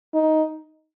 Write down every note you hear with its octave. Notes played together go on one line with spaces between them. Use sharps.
D#4